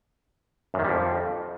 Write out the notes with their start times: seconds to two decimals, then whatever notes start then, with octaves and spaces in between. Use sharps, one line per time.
0.74 F#2
0.79 D#3
0.84 G3
0.89 F2